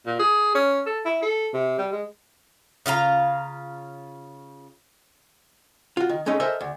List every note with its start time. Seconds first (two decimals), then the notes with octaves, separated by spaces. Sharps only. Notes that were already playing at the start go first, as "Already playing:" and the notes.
0.06 A#2
0.19 G#4
0.54 C#4
0.86 A4
1.05 E4
1.22 A4
1.54 C3
1.78 G3
1.92 G#3
2.86 C#3 F4 F5 A#5
5.97 F4 F#4
6.09 D#3
6.26 G#3 A3 C#4 D#4
6.40 A4 A#4 C5 D#5 E5 G#5
6.61 D2